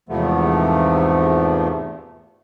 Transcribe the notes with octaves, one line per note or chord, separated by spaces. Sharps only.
E2 G#2 C3 F3 A3 B3